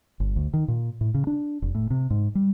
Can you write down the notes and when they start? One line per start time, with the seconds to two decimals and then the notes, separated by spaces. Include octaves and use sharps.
0.20 G1
0.36 D2
0.54 D#3
0.68 A#2
1.01 A2
1.14 C#3
1.27 D4
1.62 F1
1.75 A2
1.90 C3
2.10 G#2
2.35 G3